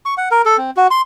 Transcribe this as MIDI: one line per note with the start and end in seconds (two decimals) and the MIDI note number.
0.06 0.14 85
0.17 0.29 78
0.31 0.42 70
0.46 0.57 69
0.58 0.71 60
0.77 0.87 66
0.91 1.01 84